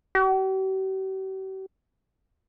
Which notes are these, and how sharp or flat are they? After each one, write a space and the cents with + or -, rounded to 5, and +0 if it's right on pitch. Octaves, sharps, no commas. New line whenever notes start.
G4 -45